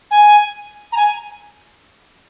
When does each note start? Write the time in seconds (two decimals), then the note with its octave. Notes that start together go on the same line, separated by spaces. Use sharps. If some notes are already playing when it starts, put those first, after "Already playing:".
0.11 G#5
0.92 A#5
0.97 G#5